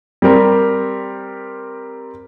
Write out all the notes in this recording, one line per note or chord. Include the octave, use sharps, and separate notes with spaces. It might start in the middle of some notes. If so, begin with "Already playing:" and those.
G3 C4 G4 A#4